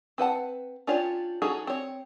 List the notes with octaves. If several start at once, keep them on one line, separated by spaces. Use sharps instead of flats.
C4 B4 F#5 A5
C#4 D4 F4 G4 C#5
C#4 D#4 F#4 G#4 A4
C4 C#5